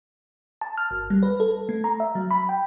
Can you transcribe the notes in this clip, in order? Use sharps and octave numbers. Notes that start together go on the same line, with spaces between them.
A5
F6
G1
G3
B4
A4
A3
A#5
E5
F#3
B5
G5